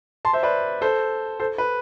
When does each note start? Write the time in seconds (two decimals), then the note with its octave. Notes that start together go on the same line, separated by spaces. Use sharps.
0.25 A5 C6
0.33 C5 E5
0.43 B4 D5
0.81 A4 C5
1.40 A4 C5
1.58 B4